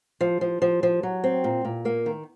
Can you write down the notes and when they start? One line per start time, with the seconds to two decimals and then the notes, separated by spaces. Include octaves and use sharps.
0.21 F3
0.41 F3
0.62 F3
0.83 F3
1.03 F#3
1.24 C4
1.44 A#2
1.65 A#2
1.85 A#3
2.06 D#3